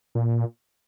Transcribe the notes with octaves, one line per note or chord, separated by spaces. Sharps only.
A#2